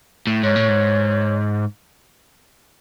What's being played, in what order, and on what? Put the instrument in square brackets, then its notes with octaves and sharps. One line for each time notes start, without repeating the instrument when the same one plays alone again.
[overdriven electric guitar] A2
[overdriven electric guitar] G#2 [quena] C#5
[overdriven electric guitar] A2
G#2